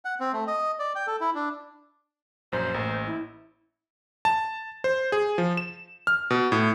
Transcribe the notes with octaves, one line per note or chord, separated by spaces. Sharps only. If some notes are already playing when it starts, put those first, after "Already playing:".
F#5
C4
A3
D#5
D5
G5
A4
E4
D4
A#1 F#2 C5
A1 A#3
E4
A5
C5
G#4
F3
E7
F6
B2
A2